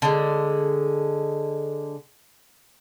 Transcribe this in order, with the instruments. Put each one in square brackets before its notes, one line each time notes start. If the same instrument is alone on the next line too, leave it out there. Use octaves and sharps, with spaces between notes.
[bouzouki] D3 G#3